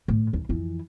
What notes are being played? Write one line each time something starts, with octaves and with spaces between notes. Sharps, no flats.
A2
D#2
F2 E3